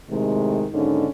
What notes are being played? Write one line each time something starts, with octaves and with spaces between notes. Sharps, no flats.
A2 C3 D#3 G#3
D#2 G#2 D3 C#4 D#4